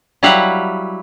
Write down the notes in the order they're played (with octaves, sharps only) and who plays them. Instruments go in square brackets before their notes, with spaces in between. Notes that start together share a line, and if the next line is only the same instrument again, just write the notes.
[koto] F#3 G3 E4 F5 F#5